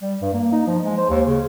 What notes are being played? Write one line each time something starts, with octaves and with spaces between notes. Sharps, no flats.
G3
G2
A#3
D#4
F3
G#3
C5
D#2
C#3